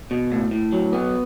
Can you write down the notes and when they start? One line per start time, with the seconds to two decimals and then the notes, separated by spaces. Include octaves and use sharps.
0.11 B2
0.32 A2
0.51 A2
0.73 F#3
0.93 B3